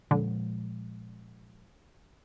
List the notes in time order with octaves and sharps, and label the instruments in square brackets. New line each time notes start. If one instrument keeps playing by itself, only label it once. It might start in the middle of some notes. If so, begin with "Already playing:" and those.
[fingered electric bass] A#2 F3 G#3 [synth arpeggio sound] D3